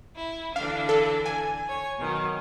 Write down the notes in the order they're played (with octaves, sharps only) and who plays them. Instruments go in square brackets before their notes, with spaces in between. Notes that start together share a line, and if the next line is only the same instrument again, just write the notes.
[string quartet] E4
[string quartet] D3 E3 D4 [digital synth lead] F5
[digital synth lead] A4
G#5
[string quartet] C#5
B2 D#3 F#3